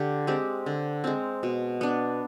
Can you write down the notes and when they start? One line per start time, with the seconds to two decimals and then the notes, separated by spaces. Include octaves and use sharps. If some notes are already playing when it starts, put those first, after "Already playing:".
Already playing: D3 G4
0.27 G#3 C4 G4
0.66 D3
1.04 G#3 C4
1.43 B2
1.81 B3 D4